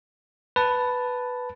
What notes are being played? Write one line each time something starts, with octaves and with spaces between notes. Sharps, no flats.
B4 A5